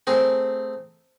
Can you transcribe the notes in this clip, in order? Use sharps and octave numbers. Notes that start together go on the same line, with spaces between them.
A3 C4 G#4 A#4